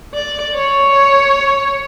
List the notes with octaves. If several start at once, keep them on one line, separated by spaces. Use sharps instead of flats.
D5
C#5